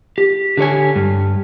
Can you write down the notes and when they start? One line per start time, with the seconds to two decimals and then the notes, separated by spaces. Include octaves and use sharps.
0.18 G4
0.57 D3 G4 C#5 G#5
0.96 G2